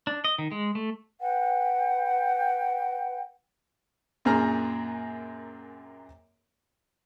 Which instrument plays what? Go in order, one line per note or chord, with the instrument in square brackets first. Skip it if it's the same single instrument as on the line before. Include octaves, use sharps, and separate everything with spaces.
[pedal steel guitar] D4
D#5
D#3
G#3
A3
[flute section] B4 F#5 G5
[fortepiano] F#2 A#2 C4 G#4 A#5 F6